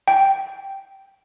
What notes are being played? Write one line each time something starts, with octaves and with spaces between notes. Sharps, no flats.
G5